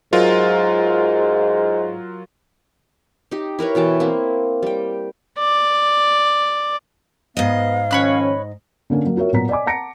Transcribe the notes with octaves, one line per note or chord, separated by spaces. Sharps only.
G#2 F#3 F4 A#4
D#4 G4
E4 A#4 B4 C#5
B2 E3 G5 A5
A#3 C4 E4
G3 G5
D5
G#2 B3 D#5 F5
D#3 F3 C#4 C#5 B5 F#6
D3 A#3 C#4 A#4
F#3 A#3
F4 F#4 A#4 C#5 E5
A#2 F#3 B3 A#5 B6
D5 D#5 G#5 D6
F#5 A5 A#5 A#6 C#7 D7